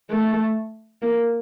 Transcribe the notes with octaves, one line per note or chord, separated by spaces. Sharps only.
A3
A#3